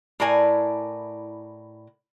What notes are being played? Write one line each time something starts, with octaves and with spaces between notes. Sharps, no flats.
A2 E4 A#4 D5 G#5